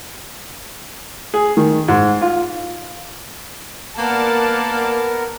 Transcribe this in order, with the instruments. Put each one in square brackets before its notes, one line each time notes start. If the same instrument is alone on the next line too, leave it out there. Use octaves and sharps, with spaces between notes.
[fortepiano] G#4
D#3
G#2
F4
[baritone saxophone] A#3 [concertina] B3 A#4 [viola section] D5 F#5 A5